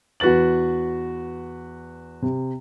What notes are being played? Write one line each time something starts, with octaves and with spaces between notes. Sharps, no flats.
E2 F#4 B4 A6 F#7
C3